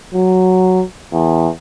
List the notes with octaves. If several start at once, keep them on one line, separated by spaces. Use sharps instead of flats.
F#3
E2